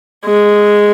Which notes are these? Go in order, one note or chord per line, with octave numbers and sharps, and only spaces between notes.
G#3